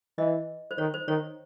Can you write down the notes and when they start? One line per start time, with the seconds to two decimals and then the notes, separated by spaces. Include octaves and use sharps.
0.18 E3 D#5
0.71 C5
0.78 D#3 C#5
0.94 C5
1.08 D#3 C#5